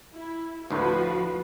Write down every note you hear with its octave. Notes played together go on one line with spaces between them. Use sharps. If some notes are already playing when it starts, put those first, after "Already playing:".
E4
D2 A2 F3 F#4 B4